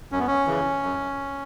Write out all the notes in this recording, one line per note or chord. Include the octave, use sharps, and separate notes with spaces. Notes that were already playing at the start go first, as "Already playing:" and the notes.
F#2 C#4
B3
C#4
C#3 E3
F#2